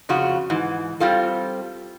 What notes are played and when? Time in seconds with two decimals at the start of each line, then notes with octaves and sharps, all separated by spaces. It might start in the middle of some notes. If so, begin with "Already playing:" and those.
0.09 F2 C#3 F4 F#4
0.50 G#2 E3
1.00 G3 C4 F4 A4